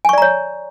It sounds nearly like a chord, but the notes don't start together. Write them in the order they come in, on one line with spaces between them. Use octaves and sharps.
G#5 C#6 D5 A#5 C#5